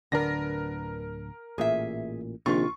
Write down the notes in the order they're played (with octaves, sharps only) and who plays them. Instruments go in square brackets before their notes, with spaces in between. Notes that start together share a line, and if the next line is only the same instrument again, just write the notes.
[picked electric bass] D1 D3 D4 [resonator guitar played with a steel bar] B3 [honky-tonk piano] A#4 A#6
[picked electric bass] A1 A#2 [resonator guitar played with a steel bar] G#4 E5
[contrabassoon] A#1 [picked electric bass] C3 D#3 [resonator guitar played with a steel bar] F4 [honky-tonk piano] C#6